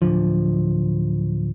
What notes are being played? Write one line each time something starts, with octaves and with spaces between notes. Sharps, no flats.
D1 C2 D3 F3